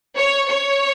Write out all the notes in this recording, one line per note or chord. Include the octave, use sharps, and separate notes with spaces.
C#5
C#5